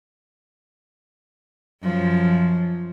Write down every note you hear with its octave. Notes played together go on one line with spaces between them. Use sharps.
F#2 F3